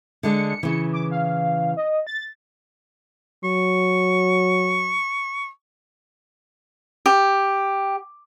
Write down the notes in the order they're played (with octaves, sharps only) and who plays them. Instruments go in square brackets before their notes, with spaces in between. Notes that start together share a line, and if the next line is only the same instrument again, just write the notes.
[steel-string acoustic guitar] D3 G#3 D4 [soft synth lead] C#7
[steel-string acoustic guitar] C#3 E3
[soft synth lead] D6
F5
D#5
A6
[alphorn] F#3 [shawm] C#6
[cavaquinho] G4